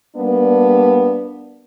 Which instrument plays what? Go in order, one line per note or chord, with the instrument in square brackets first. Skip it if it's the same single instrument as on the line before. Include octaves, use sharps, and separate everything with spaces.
[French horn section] G3 A#3 B3 D4